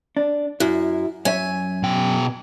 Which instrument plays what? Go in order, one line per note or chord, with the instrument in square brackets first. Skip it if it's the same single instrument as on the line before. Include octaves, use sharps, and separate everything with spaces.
[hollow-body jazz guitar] D4
[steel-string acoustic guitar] F#2 [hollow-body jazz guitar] E4
[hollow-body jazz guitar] F#2 C#5 E5 [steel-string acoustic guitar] G#5
[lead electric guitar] B2 G5